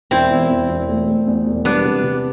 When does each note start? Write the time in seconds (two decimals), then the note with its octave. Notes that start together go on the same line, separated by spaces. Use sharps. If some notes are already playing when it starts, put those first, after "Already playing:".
0.11 E1 C4 E4
0.31 E2
0.49 E2
0.69 E1
0.89 A3
1.08 A3
1.27 E2
1.46 E1
1.65 G3 B3 D4
1.85 C3
2.04 C3